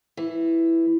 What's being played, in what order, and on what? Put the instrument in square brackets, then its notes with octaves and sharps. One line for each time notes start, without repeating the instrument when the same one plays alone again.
[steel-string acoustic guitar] E3